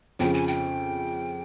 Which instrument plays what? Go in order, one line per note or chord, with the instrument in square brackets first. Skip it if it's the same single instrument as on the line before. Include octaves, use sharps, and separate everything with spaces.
[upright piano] F2 C#3 F3 [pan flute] G5
[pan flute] G#5
G5